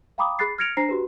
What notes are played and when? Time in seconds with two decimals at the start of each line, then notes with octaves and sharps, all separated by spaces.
0.18 F5 G5 A#5 B5 D6 D#6
0.39 G#4 B5 F#6 A6 C7
0.58 F6 G#6 A#6 C#7 D7 F7
0.77 D4 C5 A#5 A#6 C7
0.89 F#4 G4 B4